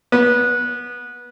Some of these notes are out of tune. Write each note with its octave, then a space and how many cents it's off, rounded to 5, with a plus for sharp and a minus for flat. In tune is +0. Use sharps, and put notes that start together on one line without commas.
B3 -20